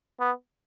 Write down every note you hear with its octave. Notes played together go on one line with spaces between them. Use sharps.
B3